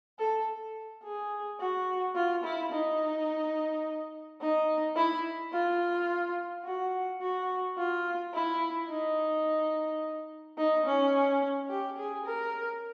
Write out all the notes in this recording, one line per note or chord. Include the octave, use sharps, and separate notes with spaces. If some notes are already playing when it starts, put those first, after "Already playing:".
A4
G#4
F#4
F4
E4
D#4
D#4
E4
F4
F#4
F#4
F4
E4
D#4
D#4
C#4
G4
G#4
A#4